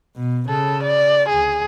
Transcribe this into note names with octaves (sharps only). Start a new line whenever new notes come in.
B2
C#3 A4
D5
D2 G#4